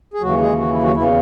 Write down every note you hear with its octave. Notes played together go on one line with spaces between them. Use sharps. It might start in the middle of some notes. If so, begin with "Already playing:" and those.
G#4
D#2 C#3 E3 F#3 F#4
G#3 G#4
F#4
E4
F#3 F#4
E2 C#3 E3 E4